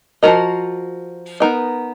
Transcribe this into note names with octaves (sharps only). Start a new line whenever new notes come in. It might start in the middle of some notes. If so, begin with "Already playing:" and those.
F3 B3 F#4 A#4 D#5
B3 D#4 A#4 D#5